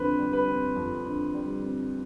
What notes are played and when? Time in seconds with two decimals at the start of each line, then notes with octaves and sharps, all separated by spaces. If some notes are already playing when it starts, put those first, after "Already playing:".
Already playing: F2 D3 G3 C4 B4 C5
0.19 G3
0.33 B4
0.48 C4
0.76 F2
1.05 D3
1.34 G3
1.64 C4